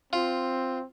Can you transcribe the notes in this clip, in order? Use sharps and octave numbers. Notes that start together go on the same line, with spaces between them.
C4 F4